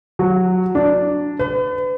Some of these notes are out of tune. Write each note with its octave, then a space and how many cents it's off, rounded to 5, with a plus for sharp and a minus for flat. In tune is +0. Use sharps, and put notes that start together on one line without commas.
F#3 -10
D4 -5
B4 +40